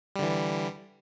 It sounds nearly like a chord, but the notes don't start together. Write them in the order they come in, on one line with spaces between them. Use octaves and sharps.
G3 D3 E3